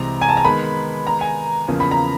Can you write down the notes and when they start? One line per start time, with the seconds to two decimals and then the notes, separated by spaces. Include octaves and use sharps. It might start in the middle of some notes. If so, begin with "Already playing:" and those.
Already playing: C2 C3 E3 G#3 C4 A#5
0.21 G#5
0.29 A5
0.37 A#5
0.44 D#3 G#3 B3 B5
1.07 A#5
1.21 G#5
1.68 E2 C#3 F3 A#3
1.80 B5
1.91 A#5